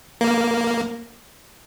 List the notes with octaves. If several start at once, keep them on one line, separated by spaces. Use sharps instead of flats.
A#3